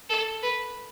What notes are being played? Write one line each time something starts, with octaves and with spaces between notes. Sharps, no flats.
A4
B4